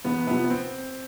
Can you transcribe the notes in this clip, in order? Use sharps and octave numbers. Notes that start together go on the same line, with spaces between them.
E2 B3
C3 F3 B3
B3
C4